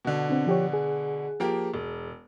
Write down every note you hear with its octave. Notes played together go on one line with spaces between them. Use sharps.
B2 D3
C4 D4
F3 G4 C#5
G#4
F3 A#3 G4
E1